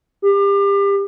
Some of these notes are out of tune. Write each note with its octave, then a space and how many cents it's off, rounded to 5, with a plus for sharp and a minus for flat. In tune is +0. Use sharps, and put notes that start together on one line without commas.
G4 +30